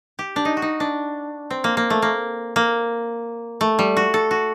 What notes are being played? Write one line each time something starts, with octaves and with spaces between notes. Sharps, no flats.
G4
D4
D#4
F#4
D#4
D4
C4
A#3
A#3
A3
A#3
A#3
A3
G3
F#4
A4
F#4